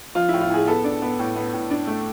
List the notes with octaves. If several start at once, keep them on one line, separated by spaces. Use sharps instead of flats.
F3 F4
A2 E4
F4
A2 G#4
B3 A4
D4
B3
A2
B3
A2
D4
A3